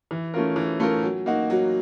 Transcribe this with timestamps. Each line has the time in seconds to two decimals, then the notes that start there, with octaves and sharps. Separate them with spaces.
0.11 E3
0.34 A3 C#4 F4 A#4
0.56 E3
0.80 A3 C#4 F4 A#4
1.04 F#3
1.26 A#3 D#4 F#4
1.50 F#3